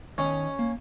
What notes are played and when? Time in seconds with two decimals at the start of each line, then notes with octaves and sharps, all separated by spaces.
0.18 D#3 C#4 C#5 D#5
0.59 A#3